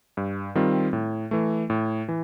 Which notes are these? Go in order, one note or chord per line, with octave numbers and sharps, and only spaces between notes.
G2
D#3 G3 C4 F4
A2
E3 A3
A2
E3